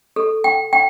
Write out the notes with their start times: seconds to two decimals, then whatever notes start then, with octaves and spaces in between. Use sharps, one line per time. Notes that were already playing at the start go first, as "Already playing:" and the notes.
0.16 A4
0.44 G5
0.73 G5